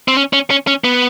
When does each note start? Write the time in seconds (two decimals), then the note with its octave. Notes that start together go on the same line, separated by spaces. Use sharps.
0.08 C4
0.16 C#4
0.33 C#4
0.50 C#4
0.67 C#4
0.84 B3